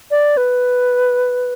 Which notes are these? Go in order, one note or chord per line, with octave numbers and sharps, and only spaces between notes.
D5
B4